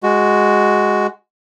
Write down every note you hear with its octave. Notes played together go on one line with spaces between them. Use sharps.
G#3 F#4